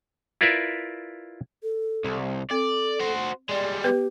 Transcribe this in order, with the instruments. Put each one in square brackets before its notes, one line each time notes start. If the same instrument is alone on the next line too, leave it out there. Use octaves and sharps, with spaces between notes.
[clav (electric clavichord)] E4 F4 A#4 B4 D5 E5
[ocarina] A4
[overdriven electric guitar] C2
[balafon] C4 [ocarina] A4 [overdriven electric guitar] D5
[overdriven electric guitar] F#4 C5
[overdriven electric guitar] G3 G#3 [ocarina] D5
[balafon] B3 B4 [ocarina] G4